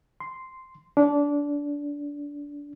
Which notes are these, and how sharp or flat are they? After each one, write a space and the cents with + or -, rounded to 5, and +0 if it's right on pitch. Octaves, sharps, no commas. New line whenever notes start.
C6 -5
D4 -20